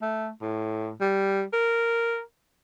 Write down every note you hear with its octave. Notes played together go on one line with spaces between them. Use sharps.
A3
A2
G3
A#4